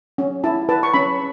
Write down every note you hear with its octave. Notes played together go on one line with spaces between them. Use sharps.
C#4
E4 A5
B4 A5
C#6
C#4 B5